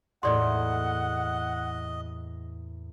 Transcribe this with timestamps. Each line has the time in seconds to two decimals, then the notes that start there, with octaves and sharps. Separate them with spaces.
0.23 E2 A2 A#3 D5 D#5 F#5 C6